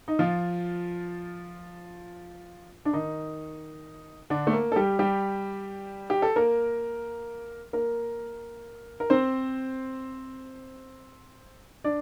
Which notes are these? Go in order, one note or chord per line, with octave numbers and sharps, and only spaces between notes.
D#4
F3 F4
D4
D#3 D#4
D3 D4
A3
A#3
A4
G3 G4
G3 G4
G4
A4
A#3 A#4
A#3 A#4
A#4
C4 C5
D4 D5